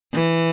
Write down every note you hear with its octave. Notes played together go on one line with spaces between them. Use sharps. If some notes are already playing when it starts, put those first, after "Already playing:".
E3